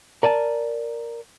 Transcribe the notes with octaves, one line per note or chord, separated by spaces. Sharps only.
A#4 D5 G#5 A5